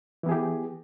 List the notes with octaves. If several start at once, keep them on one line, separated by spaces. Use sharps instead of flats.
E3 B3 G4 G#4